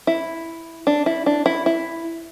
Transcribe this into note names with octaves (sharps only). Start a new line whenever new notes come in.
E4
D4
E4
D4
E4
E4